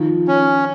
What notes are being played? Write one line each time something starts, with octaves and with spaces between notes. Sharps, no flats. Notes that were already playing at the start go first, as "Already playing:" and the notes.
Already playing: D#3 F3
C#4